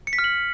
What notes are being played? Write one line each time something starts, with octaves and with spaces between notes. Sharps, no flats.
C#7
B6
F6
F#7